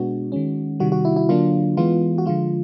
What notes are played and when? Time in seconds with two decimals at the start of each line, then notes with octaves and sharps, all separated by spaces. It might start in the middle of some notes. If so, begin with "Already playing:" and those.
Already playing: B2 G#3 B3 D4 F#4
0.32 D#3 G#3 C#4
0.80 C3 D#3 G3 F#4
0.92 F#4
1.05 E4
1.16 E4
1.29 D3 F#3 A#3 D4 F4
1.77 E3 G#3 B3 F4
2.18 F#4
2.25 D3 F3 G#3 F4